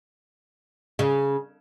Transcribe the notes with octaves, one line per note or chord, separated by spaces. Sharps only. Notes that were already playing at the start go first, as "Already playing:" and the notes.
C#3